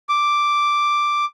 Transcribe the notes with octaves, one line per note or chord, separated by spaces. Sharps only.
D6